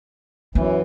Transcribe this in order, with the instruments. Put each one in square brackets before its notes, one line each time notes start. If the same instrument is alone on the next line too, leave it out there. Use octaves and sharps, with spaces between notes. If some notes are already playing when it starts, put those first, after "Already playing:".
[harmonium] F#2 E3 [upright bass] B3 D#4